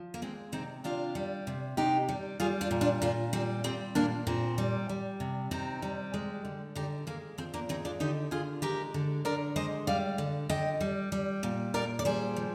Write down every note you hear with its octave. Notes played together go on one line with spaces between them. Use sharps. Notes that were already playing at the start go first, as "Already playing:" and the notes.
Already playing: F3
A#3
G#3 C4
C3 C4 D#4
C3 D4 F4
G3
C3
C3 D#4 G4
G3
G3 F4 G#4
D4 F4
A#2
D4 F4
A#2 D4 F4
G3 C4
G3 C4
A#2 A#3 D4
A#2 C4
G3
G3
C3
C3 C4 D#4
G3
G#3
D3
D3 D#4 G4
G#3 A#3
F3 C4
A#3 D4
G#3 C4 D#4
D4 F4
D3 D#4 G4
D3 F4 G#4
G#3 G4 A#4
D3
D3 A#4 D5
G#3 C5 D#5
G3 D5 F5
D3
D3 D#5 G5
G3
G3
A#2
A#2 A#4 D5
D5
G3 G#4 C5
F3